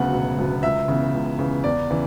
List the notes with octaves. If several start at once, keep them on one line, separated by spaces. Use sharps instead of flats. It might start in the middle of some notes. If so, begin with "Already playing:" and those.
Already playing: D2 C#3 F#3 B3 F#5
E1
D2 C#3 F#3 B3
C#2 E5
C#3 E3 B3
C#2
C#3 E3 B3
E2 D5
C#3 E3